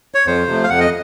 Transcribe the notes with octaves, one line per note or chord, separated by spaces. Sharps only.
C#5
F2 C5
C3 F3 A3
F5
F2 F#5
D#5